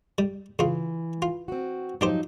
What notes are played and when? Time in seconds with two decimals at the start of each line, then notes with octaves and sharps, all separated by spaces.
0.18 G3
0.59 C#3 E3 F4
1.22 F4
1.48 C4 F#4
2.01 F3 F#3 D4 D#4 G4 C5